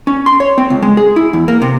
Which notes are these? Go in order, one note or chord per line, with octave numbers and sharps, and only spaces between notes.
C#4
C6
C#5
C4
C#2
G#3
G#4
E4
E2
A#3
C3